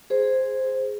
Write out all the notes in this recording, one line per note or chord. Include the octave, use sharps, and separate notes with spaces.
G#4 C5